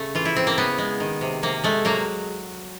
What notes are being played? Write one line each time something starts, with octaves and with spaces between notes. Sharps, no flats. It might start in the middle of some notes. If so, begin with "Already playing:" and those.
Already playing: C#3 A3
E3 F4
E4
C#3 C4
A#3
C#3 B3
G#3
D#3
C3
C3 A#3
G#3 A3
F#3 A#3